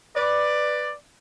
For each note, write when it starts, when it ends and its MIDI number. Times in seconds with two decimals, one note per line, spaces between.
0.15 0.91 71
0.15 0.91 74